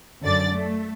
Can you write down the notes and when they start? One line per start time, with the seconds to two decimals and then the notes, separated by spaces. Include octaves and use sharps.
0.22 F#2 D3 D5 D6 A6
0.54 A3